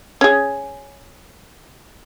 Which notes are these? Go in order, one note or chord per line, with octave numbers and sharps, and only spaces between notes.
C#4 G#4